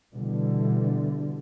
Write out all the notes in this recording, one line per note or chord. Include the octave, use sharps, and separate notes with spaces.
B2 D3 E3 G3